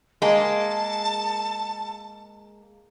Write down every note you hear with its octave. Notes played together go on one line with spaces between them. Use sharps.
G#3 A#3 A5